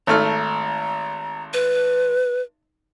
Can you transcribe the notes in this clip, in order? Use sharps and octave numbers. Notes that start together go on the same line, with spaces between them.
G#1 A3 A#5 F6
B4